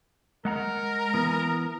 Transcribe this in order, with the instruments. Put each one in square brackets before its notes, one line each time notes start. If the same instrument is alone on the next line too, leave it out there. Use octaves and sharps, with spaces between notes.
[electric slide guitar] G#3 F#5 A#5 [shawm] A#4
[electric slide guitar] E3 B3